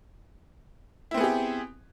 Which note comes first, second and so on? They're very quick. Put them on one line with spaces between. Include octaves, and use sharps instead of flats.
E4 C4 B3 G#4 G4